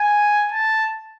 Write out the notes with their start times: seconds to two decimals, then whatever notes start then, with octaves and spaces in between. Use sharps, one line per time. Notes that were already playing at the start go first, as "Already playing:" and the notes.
Already playing: G#5
0.52 A5